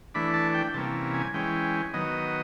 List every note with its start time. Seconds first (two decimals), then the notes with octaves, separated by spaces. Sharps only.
0.14 E3 A3 D4 B5
0.34 A5
0.54 G5
0.74 C3 E3 G3 A#3 C#4 A5
1.14 G#5
1.34 E3 G#3 C#4 G5
1.94 D#3 F#3 B3 D#5